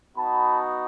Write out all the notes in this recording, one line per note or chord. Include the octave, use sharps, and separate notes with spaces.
B3 D#4 F#4 A5 B5